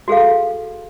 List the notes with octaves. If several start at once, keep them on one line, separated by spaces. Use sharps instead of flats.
F#4 G#4 A4 F5